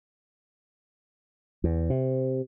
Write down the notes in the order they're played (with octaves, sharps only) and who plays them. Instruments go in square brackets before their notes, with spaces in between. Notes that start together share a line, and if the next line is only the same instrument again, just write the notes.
[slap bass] E2
C3